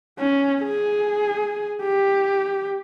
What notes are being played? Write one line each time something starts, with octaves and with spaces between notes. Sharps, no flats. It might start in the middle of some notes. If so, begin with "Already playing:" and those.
C#4
G#4
G4